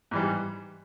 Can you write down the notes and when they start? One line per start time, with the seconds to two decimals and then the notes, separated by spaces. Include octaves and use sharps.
0.11 G#2 E3 G3